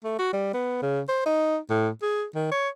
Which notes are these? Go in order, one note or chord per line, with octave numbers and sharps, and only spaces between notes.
A3
F#4
G3
B3
C#3
C5
D#4
A2
G#4
D#3
C#5